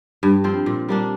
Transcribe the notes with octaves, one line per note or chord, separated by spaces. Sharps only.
G2
F3 C4
A#2
G3 A#3 D4